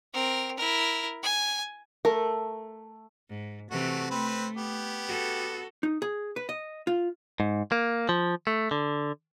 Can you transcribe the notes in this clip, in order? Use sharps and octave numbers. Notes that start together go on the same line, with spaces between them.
C4 A#4
E4 A#4
G#5
A3 A#4
G#2
C3 E3 A3 F#4
A3 C4 B4
B3 G4
F#4 A4
D#4
G#4
B4
D#5
F4
G#2
A#3
F3
A3
D3